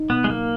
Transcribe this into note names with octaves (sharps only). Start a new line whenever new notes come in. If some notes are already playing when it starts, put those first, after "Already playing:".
Already playing: D#4
B2 B3
G#3
F#3 A#3